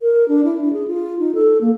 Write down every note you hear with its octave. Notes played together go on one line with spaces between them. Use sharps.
A#4
D4
E4
D4
G#4
F4
D#4
A4
A#3